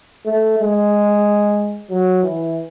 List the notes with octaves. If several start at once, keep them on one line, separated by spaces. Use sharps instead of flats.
A3
G#3
F#3
E3